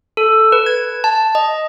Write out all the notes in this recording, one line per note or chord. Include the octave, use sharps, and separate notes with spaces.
A4
B4
G#6
A5
D#5